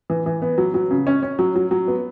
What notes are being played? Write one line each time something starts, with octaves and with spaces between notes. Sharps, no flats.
E3
E3
B3
F#3
F#3
C#3
C#4
C#4
F#3
F#3
F#3
B3